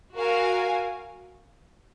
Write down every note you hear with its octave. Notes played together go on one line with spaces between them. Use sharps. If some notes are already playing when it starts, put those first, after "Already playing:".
F#4 A#4 F5 G#5